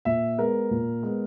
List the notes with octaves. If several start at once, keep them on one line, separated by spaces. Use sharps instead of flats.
A#2 E5
G#3 B3 A#4
A#2
G#3 B3